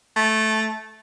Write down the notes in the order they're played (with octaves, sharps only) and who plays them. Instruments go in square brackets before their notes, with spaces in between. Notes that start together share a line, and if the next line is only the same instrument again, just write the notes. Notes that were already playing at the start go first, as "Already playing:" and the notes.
[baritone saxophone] A3